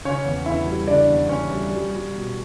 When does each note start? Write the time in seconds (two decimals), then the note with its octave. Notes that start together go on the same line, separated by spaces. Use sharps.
0.05 C#3 C#4 C#5
0.25 E2
0.46 E2 E4 E5
0.66 G3
0.87 C#3 D4 D5
1.09 E2
1.29 E2 C#4 C#5
1.49 G3
1.70 G3
1.91 G3
2.12 B2